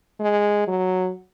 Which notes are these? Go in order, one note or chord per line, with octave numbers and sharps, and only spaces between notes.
G#3
F#3